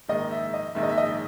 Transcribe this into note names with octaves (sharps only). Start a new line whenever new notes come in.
A#1 G#2 D#3 D#5
E5
D#5
A#1 G#2 D#3 E5
D#5
E5
D#5